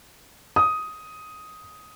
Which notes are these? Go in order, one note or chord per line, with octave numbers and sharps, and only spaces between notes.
D#6